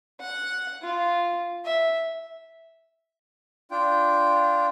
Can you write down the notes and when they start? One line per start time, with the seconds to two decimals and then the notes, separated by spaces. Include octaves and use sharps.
0.20 F#5
0.82 F4
1.65 E5
3.71 D4 F4 G5